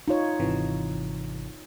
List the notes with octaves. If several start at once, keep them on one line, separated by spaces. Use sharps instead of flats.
D#4 F4 C#5
G#1 C3 E3